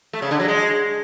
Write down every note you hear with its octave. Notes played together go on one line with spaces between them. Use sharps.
A3
C#3
D3
F#3
G#3